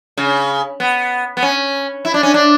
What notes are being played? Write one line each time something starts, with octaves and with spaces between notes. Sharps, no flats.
C#3
B3
B3
C#4
E4
D4
C#4
D4